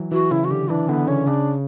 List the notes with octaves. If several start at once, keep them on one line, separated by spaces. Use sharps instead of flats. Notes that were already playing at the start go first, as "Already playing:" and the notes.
Already playing: E3 F#3
E3 F#4
C#3 E4
F#4
D3 G4
E3 D4
D3 B3
C#3 C#4
C#3 D4